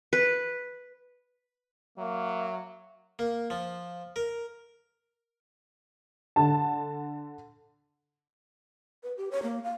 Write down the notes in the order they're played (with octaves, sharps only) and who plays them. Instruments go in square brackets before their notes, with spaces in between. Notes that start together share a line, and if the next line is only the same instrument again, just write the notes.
[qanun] B4
[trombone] F#3 [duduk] A#3 [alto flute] E5
[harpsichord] A#3
F3
A#4
[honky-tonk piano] D3 A5
[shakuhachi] B4
G4
C#5
A#3
F5